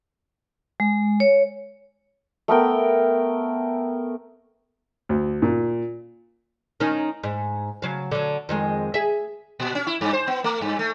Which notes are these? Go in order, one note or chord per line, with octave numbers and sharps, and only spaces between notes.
G#3
C#5
A3 B3 A#4 G5
D2
A#2
D#3 C#4 D#4
G#2
C#3 F#3 F5
D3 F#3
F2 D#3 G#3
G#4 E5
A#2
C#4
E4
G2
C5
B3
A3
G2
A3